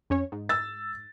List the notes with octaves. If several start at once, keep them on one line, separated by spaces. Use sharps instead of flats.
F2 C#4 C#5
G#2
E6 A6